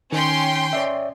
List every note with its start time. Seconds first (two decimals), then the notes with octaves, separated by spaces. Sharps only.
0.12 D#3 C#4 G5 C6
0.73 C#5 D5 E5